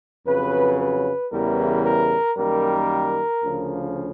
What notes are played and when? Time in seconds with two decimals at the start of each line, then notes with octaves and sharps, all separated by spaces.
0.26 F2 C#3 F#3 B4
0.79 B4
1.32 E2 C#3 E3 G3 A#4
1.84 A#4
2.37 F#2 D#3 G3 A#3 A#4
3.43 D2 C#3 F3